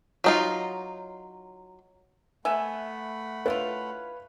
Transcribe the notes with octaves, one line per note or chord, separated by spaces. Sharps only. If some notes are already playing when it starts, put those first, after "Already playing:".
F#3 D#4 F4
A3 B3 E5 F#5 G#5 B5
D4 E4 F4 B4 C#5 F5